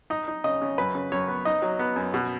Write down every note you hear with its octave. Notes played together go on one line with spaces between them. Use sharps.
D#4 D#5
D#4
C#3 D#5
C#3
F#2 B4
C#3
F#2 C#5
B3
D#4 D#5
F#3
B3
F#2
B2